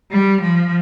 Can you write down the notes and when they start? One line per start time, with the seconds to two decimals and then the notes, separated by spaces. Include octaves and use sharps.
0.11 G3
0.41 F3